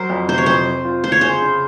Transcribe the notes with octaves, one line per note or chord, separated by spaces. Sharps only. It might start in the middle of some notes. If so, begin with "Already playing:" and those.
Already playing: F#3 A#4 C5
F2
C3 C5
C#5
F2 C5
C4
F4
F4 C5
C#5
G#4 C5
C#3